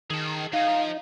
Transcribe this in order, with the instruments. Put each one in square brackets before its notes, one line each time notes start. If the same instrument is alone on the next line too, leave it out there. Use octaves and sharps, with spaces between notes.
[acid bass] D#3 [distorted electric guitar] G#4 A5
[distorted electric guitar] F#3 G#4 [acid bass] D#4 [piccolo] F5
[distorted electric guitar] F3